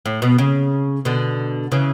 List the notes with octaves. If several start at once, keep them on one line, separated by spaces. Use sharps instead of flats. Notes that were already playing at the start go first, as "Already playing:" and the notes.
A2
B2
C#3
B2 D3
C#3 E3